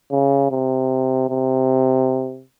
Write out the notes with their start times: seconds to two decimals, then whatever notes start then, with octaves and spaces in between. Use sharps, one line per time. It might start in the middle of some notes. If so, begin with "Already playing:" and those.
0.11 C#3
0.51 C3
1.29 C3